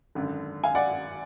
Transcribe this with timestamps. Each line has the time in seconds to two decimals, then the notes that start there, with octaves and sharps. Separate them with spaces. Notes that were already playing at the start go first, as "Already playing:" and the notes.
0.15 G#1 F#2 D3
0.64 F5 G#5
0.75 D5 F#5